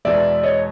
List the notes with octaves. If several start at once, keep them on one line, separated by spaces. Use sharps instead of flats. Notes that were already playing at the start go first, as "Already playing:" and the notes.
E2 B2 G#3 D5 E5
C#5 D#5